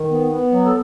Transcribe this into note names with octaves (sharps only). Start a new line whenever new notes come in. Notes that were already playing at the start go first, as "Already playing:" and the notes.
Already playing: D#3
B3
B3
F#3
A4